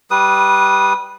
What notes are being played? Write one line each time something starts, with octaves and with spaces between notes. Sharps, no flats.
G3 B4 D#6